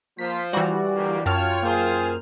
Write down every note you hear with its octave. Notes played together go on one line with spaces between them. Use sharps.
F3 A#3 F4 C5 B6
E3 G3 F#4 D5
G1 A#3 G4
F#2 F4 C#5 G5 A5 F6
A#3 F4 G#4 C5